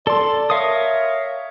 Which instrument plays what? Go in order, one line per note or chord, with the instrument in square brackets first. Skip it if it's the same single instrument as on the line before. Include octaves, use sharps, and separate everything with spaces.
[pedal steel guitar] A4 C6 [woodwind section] D5
[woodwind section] A#4 C#5 [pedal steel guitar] E5 F5 D#6